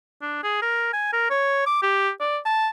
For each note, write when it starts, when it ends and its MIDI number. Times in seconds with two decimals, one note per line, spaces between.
0.22 0.42 62
0.43 0.60 68
0.62 0.89 70
0.93 1.11 80
1.13 1.26 70
1.30 1.66 73
1.66 1.82 86
1.82 2.10 67
2.20 2.38 74
2.46 2.69 81